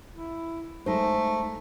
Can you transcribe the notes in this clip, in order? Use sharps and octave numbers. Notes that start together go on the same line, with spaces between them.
E4
G#3 A3 D#4 C5